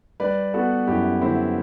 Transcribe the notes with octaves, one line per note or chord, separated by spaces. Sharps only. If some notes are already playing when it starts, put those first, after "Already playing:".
G3 B4 D5
B3 F#4 A4
F#2 E4 G4
D3 C4 E4